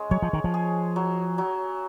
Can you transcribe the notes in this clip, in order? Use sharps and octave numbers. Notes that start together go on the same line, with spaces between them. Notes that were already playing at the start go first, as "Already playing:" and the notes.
Already playing: G#3 C#4
F#3 C#5
F3
D#3
F3
G#4
F#3
F#3